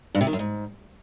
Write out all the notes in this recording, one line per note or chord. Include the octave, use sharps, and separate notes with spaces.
G2
C3
D#3
F#2
G#2